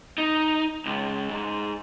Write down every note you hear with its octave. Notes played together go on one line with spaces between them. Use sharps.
D#4
C#2
G#2